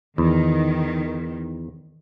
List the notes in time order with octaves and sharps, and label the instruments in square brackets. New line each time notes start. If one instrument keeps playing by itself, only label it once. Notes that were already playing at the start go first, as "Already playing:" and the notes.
[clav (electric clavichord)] E2 [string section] D#3